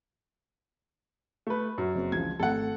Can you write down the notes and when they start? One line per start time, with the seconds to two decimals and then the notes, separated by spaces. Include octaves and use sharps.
1.47 A3 B4
1.78 F#2 F#4
1.95 F#1 C4
2.12 C#2 E3 F3 G#6
2.40 G#1 A3 A4 F#5